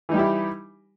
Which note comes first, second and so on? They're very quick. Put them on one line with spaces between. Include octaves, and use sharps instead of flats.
E3 D#4 G3 G4 E4